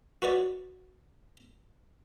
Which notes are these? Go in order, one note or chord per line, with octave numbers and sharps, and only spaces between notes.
F#4 B4 C#5 D5